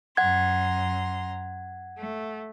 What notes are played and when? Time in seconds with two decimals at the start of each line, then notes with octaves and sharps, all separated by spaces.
0.17 F#2 F#5 A#5 C6 G#6
1.97 A3